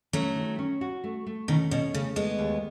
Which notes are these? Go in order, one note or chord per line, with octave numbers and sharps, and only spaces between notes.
F#3 A3 C#4
D#3
C#4
F#4
A3
A3
B2 D#3 C#4
B2 C#4
C#3 A3
G#3 A3 B3
D#2